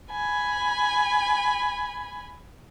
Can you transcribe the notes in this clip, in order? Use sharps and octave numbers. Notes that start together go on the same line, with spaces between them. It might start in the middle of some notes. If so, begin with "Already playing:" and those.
G#5 B5